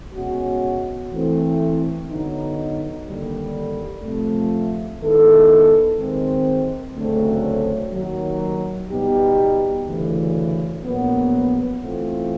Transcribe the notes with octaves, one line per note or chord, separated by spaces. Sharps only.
B2 G#3 C#4 F#4
E3 A3 C4
D3 F#3 B3 D#4
D#2 D3 G3
C3 F3 A3
D#3 G#3 B3 E4 A4
D#3 G#3 C4
D2 C#3 F#3 A3 C4
D#2 D#3 F#3
B2 G3 B3 D#4 G4
D2 C#3 E3
A#1 A#2 F#3 B3
E3 A3 C4 F4